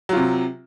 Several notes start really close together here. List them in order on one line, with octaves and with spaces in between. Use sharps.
F#3 F4 C3